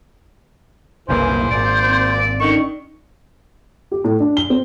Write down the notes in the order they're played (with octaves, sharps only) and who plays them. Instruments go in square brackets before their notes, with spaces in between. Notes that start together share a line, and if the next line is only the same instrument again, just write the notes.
[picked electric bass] F#1 C2 A#2 [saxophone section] C#3 E3 [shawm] C5
[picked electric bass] G#1 [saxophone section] A#2 D5
[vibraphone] C4
[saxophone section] D3 D#3 [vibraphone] C#4 D#4 D5 [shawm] C#6
[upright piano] G4
A2
D4
G7
C4